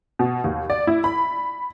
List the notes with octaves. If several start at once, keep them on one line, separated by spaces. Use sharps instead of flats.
B2
D#2
D5
E4
B5